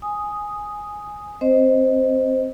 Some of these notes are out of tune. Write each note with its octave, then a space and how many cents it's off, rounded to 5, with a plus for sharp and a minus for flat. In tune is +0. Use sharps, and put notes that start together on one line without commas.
G#5 +0 D#6 +0
C4 +10 C5 +0 D#5 +0